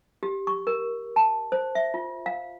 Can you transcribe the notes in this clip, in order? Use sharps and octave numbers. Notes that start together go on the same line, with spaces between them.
G4
C#6
A#4
A5
C5
E5
F4
F5